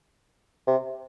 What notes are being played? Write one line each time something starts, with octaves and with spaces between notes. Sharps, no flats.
C3